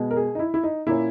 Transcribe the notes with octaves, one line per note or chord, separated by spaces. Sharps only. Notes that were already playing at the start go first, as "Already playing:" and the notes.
Already playing: B2 G#3 B3
A#4
G#4
D#4
E4
E4
D#4
A#2 A#3 C#4 E4